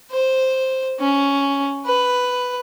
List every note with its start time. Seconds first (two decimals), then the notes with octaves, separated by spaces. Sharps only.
0.11 C5
0.99 C#4
1.86 B4